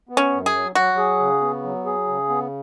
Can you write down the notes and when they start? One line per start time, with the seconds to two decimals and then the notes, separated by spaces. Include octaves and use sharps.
0.09 B3
0.17 C#4
0.32 F#2
0.46 G#4
0.54 F#3
0.75 F#3 F#4
0.97 G#4
1.19 C#3
1.41 B3
1.63 F#3
1.85 G#4
2.08 C#3
2.29 B3